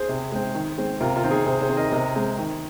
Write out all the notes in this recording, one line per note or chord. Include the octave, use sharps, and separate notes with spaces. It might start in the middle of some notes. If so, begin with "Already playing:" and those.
Already playing: G#4 C5
C3
G#3 C4
D#3
G#3 C4
C3 F4 A#4
F4 A#4
D#3 C4
D#4 G#4
C3 G#4 C5
G#4 C5
D#3 C4
A#4 D#5
C3 A#4 D#5
G#3 C4
D#3